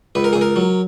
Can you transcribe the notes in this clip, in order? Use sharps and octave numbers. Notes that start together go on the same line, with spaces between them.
C#2 B4
A#4
C#2 G#4
A#4
F#3